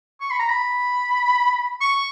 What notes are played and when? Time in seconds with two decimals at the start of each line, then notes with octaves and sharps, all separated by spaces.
0.20 C#6
0.31 B5
0.39 A#5
0.49 B5
1.81 C#6